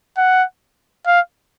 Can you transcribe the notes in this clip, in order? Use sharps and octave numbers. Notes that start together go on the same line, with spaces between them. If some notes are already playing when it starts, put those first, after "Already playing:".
F#5
F5